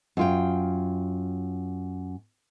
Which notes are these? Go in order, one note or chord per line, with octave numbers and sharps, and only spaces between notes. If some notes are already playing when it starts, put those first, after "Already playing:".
F#2 F4 G5